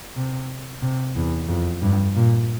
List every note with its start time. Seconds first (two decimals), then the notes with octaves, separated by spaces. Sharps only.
0.16 C3
0.82 C3
1.16 E2
1.48 F2
1.82 G2
2.16 A#2